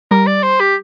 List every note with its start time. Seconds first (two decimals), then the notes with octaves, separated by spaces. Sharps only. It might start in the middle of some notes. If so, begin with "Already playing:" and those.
0.11 G3 A#4
0.27 D5
0.43 C5
0.60 G4